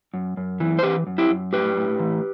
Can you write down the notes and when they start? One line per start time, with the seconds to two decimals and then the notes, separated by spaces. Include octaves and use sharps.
0.14 F#2
0.37 F#2
0.60 E3
0.79 C5
0.83 E3 G4 B4
1.07 F#2
1.18 E4 G4
1.30 F#2
1.53 A2 G4 B4
1.77 A2
2.00 E3